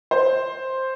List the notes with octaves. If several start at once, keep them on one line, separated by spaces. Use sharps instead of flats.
C5